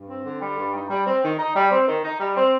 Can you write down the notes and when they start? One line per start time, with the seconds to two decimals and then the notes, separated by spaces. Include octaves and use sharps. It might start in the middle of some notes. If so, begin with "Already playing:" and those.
Already playing: G2
0.09 C4
0.25 D3
0.41 G3
0.58 G2
0.74 D#4
0.90 G3
1.07 C4
1.23 D#3
1.38 D#4
1.55 G3
1.71 C4
1.88 D#3
2.04 D#4
2.20 G3
2.36 C4